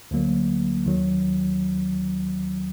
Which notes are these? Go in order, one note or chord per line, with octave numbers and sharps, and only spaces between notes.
D2 D3 F#3 A#3
D#2 D#3 F#3